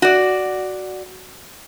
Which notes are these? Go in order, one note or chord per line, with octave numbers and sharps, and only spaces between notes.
F#4 D5